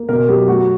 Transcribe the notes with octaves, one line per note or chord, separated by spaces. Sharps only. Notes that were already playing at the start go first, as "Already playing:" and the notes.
Already playing: A#3
B2 A#4
F#3 G4
A3 F#4